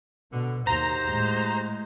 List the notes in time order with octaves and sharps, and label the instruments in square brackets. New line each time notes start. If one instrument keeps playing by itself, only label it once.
[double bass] B2 [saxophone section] D3
[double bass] D#2 [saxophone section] F#3 G4 C5 [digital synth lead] A#5
[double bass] A2 G#3